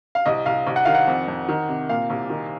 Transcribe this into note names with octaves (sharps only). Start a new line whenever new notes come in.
F5
C2 D#5
C2 F5
C2
F#5
D#3 F5
F#5
F2
F2
D#3
C3
A#2 F5
C2
D#3